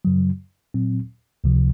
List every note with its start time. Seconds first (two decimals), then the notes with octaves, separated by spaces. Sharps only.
0.05 F#2 C#3 F#3
0.74 A#2 F#3 C4
1.44 C#2 C3 F3